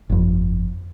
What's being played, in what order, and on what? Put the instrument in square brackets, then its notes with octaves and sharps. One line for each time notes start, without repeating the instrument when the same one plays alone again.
[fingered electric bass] G1 F2